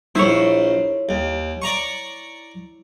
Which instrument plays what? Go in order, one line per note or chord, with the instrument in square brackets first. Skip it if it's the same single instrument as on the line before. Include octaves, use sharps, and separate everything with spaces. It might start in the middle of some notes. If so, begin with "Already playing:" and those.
[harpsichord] A#1 C5 [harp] E4 C#5
[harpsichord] D#2
D5 A#5 C#6